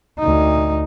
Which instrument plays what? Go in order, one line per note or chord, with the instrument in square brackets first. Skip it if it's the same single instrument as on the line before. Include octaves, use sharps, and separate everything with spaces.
[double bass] D2 D#4